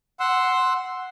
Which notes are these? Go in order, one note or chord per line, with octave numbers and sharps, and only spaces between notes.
F#5 C6 E6